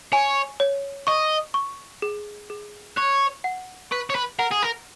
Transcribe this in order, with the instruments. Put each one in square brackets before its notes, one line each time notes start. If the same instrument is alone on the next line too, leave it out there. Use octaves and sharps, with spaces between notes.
[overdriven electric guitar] C#5 [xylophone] G#5
[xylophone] C#5
[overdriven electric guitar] D#5 [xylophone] C#6
[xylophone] C#6
G#4
G#4
[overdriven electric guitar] C#5 [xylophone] F#6
[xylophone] F#5
[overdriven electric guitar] B4 [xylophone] C#6
[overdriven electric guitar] C#5
B4
[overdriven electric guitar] A#4 [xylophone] F#5
[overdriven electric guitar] G#4
A#4